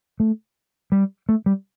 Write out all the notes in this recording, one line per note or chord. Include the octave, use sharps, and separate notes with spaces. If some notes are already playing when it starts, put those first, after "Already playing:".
A3
G3
A3
G3